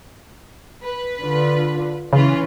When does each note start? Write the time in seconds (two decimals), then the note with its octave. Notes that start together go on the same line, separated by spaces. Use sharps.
0.82 B4
1.20 D3 F4
2.13 C#3 E3 C#4 F4 B4